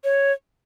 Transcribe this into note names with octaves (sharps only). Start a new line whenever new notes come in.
C#5